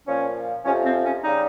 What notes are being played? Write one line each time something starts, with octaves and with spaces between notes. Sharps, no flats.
A#2 F3 C#4
F2 C3 F3 C#4
C4
C#4
C#3 G3 D#4